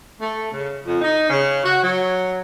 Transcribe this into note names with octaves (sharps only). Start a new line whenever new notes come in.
A3
C#3
F2
D#4
C#3
F#4
F#3